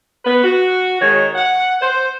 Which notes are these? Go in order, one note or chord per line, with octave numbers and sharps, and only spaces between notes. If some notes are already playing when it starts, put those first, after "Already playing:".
B3 B4
F#4
D#3 G#3 C#5
F#5
C5